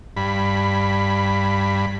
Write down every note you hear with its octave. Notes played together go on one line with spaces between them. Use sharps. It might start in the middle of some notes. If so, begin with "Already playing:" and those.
G2 B5